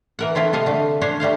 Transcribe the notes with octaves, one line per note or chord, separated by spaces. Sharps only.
E3 A#4 F#5
A3 C4 E4 F4
C3 A4 D#5 F5
D3 A3
C#4 D4 C5 C#5
G3 A3 C5 F5